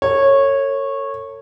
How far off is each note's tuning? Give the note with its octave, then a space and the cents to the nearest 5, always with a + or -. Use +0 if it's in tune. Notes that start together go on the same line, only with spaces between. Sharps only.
A4 +45 C#5 -15